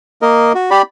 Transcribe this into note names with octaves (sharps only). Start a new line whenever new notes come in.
A#3 A#4 D#5
F#4
G4 D5 B5